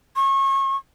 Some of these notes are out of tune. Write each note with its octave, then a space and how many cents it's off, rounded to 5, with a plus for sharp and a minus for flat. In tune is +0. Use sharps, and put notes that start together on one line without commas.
C#6 -30